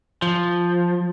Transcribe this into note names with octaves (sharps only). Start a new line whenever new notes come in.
F3